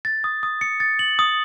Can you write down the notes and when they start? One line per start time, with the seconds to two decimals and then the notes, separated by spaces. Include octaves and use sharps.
0.05 A6
0.24 D#6
0.43 D#6
0.61 C#7
0.80 A6
0.99 F#7
1.19 D#6